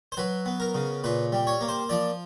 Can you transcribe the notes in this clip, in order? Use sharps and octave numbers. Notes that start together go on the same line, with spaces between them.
C5
F#3 B4
B3
A#4
C#3
A#2 B4
G3
C#5
A#3
C5
F3 D5